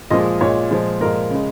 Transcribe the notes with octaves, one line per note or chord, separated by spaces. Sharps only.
A#2 F3 G#3 D#5
A#2 G#3 C#5
A#2 F3 G#3
A#2 F3 G#3 A#4
C#3 G#3